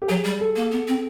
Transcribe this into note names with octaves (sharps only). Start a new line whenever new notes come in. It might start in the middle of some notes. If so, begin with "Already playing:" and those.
G4
F#3 G#4
G3
A4
A#3
B3
C4